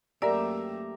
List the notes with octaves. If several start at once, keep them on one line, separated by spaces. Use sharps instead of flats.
F#2 A3 A#3 G4 A#4 D5 E5 A#5